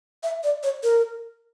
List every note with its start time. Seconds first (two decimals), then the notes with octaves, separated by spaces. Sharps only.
0.23 E5
0.44 D5
0.63 C#5
0.83 A#4